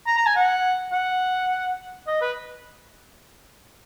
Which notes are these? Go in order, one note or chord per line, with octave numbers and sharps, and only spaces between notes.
A#5
A#5
G#5
F#5
F#5
D#5
B4